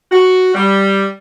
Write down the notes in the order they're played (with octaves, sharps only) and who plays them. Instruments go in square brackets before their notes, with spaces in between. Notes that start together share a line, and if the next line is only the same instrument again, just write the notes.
[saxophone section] F#4
G3